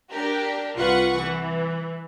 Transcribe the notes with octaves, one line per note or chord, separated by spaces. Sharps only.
D4 G4 A#4
C2 F4 B4 F#5 C#6
E3